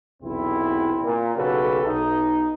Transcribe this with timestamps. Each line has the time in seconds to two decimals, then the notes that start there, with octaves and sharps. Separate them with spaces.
0.22 B1 E2 C3 C4 E4
1.03 A#2
1.36 B1 C#3 F#4 G4 A4 B4
1.84 B1 D#4